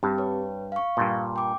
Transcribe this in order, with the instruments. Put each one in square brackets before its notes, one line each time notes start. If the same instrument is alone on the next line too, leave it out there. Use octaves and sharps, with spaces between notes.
[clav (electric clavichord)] G2 [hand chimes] C4 G4
[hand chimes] B4 C#5
F5 C#6
[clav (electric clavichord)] G2 A#2
[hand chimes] G5 D6